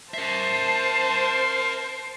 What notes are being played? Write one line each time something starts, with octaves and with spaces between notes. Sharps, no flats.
A#4 C5 E5 A5 C7